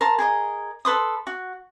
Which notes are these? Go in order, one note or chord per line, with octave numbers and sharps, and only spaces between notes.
A#4 A5 C6
G#4 A#4 D#5
A4 B4 C6 D#6
F#4